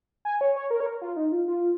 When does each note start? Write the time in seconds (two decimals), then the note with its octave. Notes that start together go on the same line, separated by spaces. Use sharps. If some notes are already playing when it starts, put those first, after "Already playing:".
0.25 G#5
0.41 C#5
0.56 C#5
0.71 A#4
0.80 C#5
0.86 A#4
1.02 F4
1.16 D#4
1.32 F4
1.48 F4